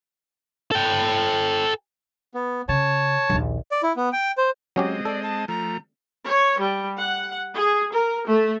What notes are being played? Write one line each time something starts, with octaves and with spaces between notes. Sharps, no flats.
A4 G5
B3
C#3 C#5 A5
A#1 D#2
D5
E4
B3
G5
C5
F#3 G#3 C4 C#4 G4 D#5
A4 D5
A5
F3 A3 A#5
C#5
G3
F#5
G#4
A#4
A3